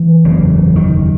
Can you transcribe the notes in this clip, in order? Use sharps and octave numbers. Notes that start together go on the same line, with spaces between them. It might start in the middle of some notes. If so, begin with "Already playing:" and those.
Already playing: E3
F#1 E2 C#3
D#3